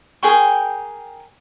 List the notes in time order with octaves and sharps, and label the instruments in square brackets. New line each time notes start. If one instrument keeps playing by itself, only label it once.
[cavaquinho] G#4 A#4 G5 C#6